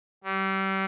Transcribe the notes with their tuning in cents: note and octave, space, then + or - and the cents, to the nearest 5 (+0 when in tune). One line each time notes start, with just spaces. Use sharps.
G3 -30